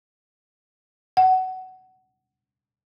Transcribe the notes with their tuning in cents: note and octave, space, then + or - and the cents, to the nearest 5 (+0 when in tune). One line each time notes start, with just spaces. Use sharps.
F#5 +20